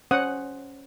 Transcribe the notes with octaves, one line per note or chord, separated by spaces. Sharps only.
C#4 C5 F#5 D#6